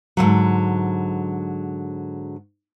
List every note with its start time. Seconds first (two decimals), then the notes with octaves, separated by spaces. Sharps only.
0.17 G#2 B2 D3 F#3